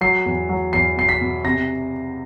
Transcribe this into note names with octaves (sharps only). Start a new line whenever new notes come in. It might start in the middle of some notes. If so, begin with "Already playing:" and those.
F#3 C7
E2
F#3
E2 C7
B2 C7
B6
B2
C3 A#6